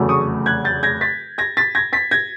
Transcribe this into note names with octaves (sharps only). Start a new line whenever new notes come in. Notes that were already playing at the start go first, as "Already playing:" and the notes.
Already playing: F1 E2 C#3 F#3 A3
C#6 D#6
F#6 G#6
G6 A6
G#6 A#6
A6 B6
G#6 A#6
A6 B6
G#6 A#6
A6 B6
G#6 A#6